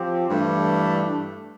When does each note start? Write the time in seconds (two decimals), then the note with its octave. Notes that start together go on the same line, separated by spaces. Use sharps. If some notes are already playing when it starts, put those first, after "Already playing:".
Already playing: F3 C4 G4
0.27 G2 E3 A3 D4